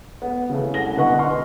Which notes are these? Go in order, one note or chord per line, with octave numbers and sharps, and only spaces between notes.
B3
C#3 E3 A3
C2 F#5 A#6 G7
B2 D3 B4 D#5 F#5 C#6
B4 D#5 C6 C#6 F6